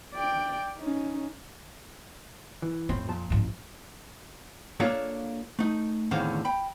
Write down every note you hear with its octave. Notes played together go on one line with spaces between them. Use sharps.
D5 G5
C#4 D#4
E3
F2 A2 C4
A#2 F3 A5
A1 G#2
A#3 D4 F4 A4 A#4 C#5
A3 D#4
E2 A2 D3 D#3 C4 F5
G5 B5